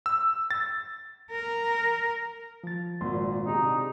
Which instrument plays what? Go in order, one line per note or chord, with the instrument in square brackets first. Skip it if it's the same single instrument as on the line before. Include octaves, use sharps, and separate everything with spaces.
[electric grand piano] E6
A6
[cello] A#4
[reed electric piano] F3 A6
[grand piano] G#1 [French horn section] A#2 [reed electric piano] C6
[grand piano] C3 [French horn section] D4 F#4 G#4 [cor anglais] D#4